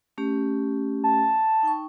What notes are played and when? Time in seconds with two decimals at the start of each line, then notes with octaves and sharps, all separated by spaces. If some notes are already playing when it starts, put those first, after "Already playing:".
0.18 A3 C#4 G4
1.04 A5
1.63 D#4 G5 C#6